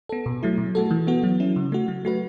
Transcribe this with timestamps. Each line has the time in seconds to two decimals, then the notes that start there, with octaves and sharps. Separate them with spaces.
0.09 B3 A4
0.26 B2
0.43 F#3 A3 E4
0.58 B2
0.75 A3 F#4 A4
0.91 E3
1.07 B3 F#4
1.24 F#3
1.40 C#4 E4
1.56 C#3
1.72 A3 F#4
1.88 F#3
2.05 A3 F#4 B4